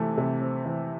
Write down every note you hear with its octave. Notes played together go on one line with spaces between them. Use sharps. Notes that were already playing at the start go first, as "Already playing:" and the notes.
Already playing: C3 E3 A3
C3
C4
E3